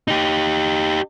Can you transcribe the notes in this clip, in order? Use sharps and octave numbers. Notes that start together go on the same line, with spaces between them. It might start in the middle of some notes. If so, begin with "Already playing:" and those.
D#4 G4